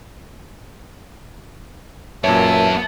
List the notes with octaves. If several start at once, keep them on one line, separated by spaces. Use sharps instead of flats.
F#2 A#2 B3 C#5 E5 A5